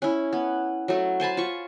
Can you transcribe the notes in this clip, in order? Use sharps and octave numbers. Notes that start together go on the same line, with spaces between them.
C#4 E4
B3
F#3 A3
C5 G#5 A5 B5
F4 C#6